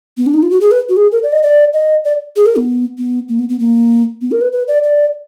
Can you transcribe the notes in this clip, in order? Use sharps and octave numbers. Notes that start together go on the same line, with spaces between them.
B3
D4
D#4
F4
F#4
G#4
B4
F#4
G#4
A#4
D5
D#5
D5
D#5
D5
G#4
A#4
B3
B3
A#3
B3
B3
A#3
B3
A#4
B4
B4
D5
D5